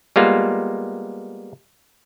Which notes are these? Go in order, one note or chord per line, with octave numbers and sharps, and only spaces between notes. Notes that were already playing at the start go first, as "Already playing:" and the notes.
G3 G#3 A#3 B3 F4